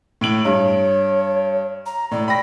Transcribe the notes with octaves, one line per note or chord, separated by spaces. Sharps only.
A2 D7 F#7
G2 C#5
A#5
A2 D5
G5 B5 A#6